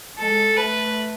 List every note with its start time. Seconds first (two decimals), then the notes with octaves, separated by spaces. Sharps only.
0.18 G#3 A4
0.57 A3 B4